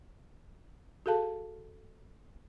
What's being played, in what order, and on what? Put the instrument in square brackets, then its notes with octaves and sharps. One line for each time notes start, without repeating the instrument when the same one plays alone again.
[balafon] F#4 G#4 A4 F5 A5